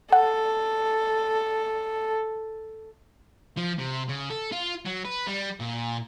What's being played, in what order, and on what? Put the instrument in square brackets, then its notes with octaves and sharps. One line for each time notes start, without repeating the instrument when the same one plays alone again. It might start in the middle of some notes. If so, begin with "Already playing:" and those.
[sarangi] A4 [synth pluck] F#5
[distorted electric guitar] F3
C3
C#3
A4
F4
F#3
B4
G3
A#2